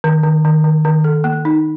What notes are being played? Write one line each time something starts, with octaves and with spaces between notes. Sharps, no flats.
D#3
D#3
D#3
D#3
D#3
A4
A#3
D#4